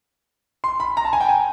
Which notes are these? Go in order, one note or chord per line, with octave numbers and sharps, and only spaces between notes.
C6
B5
A#5
A5
G#5
G5
G#5